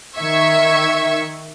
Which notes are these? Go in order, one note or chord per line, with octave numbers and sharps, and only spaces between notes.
D#3 E5 C#6 G#6